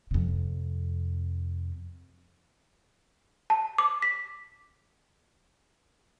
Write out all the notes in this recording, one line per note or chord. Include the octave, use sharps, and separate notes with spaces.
F2 C3
A5
D6
B6